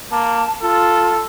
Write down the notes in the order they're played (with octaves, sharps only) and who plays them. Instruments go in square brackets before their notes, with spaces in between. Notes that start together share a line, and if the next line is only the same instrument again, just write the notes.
[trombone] A#3 [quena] A5
[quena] F4 [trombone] A4